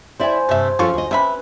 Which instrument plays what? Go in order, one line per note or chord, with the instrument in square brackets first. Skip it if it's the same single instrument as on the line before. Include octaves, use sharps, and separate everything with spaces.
[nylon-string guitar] E4 D5 E5 [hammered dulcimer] C5 G#5
[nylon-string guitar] G2 C3 [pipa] A3 E5
[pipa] C#3 F4 C#6 [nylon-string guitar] F3 C#4 A4
[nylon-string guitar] D2 D#5
[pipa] C3 E5 B5 [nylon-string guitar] C#4 [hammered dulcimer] B4